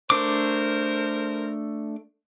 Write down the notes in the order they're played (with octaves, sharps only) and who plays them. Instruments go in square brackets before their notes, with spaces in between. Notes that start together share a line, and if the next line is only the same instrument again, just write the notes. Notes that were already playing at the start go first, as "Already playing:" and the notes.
[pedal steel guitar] A3 D4 D6 [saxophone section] A#4 C5